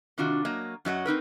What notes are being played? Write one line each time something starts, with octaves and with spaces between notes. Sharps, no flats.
C3 D#3 D4 F4 F#4
F#3 A#3 D#5
F#2 F#3 D#5 F#5
C4 D#4 A#4 B4